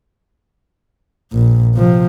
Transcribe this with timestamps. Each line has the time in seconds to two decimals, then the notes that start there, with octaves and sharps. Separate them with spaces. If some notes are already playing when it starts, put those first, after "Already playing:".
1.32 A#1 A#2
1.75 C3 F3